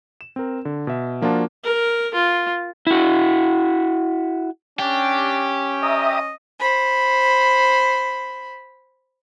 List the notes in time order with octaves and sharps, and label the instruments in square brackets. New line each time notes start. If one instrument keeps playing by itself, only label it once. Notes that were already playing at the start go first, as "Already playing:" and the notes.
[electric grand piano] E7
C4 A#4
D3
B2 E5
F3 A#3 D4 F4 F#4 A5
[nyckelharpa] A#4
F4
[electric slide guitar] E4 F#4
[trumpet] C#4 [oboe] D4 [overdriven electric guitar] G4
[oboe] D#5 [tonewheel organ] E5 A#5 D#6
[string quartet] C5 B5